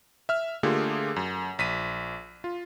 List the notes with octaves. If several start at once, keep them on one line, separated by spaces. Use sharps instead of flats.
E5 F6
D3 A3 A#3 F4 G4 G#4
F#2
A#1 B6 D#7
F4